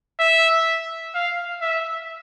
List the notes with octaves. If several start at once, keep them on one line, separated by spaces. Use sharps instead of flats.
E5
F5
E5